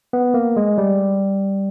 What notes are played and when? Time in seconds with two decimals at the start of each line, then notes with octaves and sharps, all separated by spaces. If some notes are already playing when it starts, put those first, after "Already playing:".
0.13 B3
0.34 A#3
0.57 G#3
0.78 G3